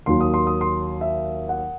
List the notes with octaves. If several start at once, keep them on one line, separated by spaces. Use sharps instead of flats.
D#2 D#3 F#3 C6
D#6
C6
D#6
C6
E5
F#5